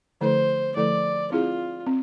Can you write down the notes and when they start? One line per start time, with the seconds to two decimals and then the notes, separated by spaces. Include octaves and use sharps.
0.21 D3 F3 A3 E4 A4 C5
0.76 D3 F3 A3 E4 A4 D5
1.32 C4 E4 F4 G#4
1.87 C4